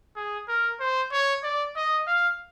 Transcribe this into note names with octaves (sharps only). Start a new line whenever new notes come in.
G#4
A#4
C5
C#5
D5
D#5
F5